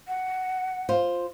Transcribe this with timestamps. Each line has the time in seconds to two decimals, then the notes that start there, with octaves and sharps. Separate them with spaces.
0.08 F#5
0.89 F4 C5